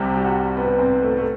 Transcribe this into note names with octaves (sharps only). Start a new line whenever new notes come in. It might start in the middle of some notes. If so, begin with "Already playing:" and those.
Already playing: C2 C3 G3 G4
G4
F#4
B3
C4
A3
A3